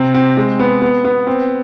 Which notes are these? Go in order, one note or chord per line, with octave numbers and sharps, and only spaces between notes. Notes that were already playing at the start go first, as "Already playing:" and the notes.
Already playing: C3 C4
C4
G#3
B3
B3
B3
C4